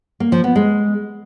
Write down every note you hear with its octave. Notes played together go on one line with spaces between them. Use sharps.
A#3
F3
B3
G#3